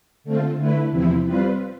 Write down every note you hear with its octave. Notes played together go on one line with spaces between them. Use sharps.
D3 A3 C4 F4
D3 A3 E4 B4
E2 C3 F3 C4 E4
G3 C4 F4 B4